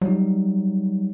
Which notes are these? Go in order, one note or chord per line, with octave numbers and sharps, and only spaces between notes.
F#3 G3 D#4